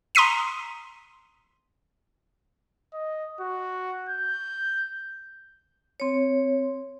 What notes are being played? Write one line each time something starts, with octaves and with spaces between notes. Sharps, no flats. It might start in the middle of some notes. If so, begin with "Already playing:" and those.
A#5 C6 D#6 B6 D#7
D#5
F#4
G6
C4 C#5